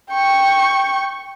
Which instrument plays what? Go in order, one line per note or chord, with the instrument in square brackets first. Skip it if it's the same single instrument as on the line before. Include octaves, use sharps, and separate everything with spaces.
[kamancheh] G5 C#6